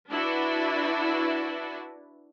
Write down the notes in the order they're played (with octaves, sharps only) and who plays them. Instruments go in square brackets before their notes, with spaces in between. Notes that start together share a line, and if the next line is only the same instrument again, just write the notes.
[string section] D4 E4 F#4 B4